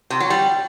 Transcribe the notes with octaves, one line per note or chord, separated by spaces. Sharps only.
C3
F#3
G3